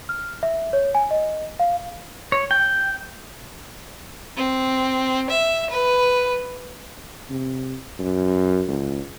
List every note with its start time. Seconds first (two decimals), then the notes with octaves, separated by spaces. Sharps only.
0.09 F6
0.43 E5
0.73 C#5
0.95 G#5
1.11 D#5
1.60 F5
2.32 C#5
2.51 G5
4.37 C4
5.29 E5
5.70 B4
7.30 C3
7.99 F#2
8.67 C#2